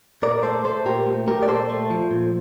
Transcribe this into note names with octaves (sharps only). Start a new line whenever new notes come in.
A#2 A#4 D5
A3 A4 C5
A3 A4 C5
A#2 G4 A#4
A3
A3 G4 A#4
D5
A#2 A4 C5
A3
F3
A#2